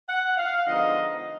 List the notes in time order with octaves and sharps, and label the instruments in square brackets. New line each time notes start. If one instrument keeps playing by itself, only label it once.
[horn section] F#5
F5
D3 F3 G#3 B3 D#4 D#5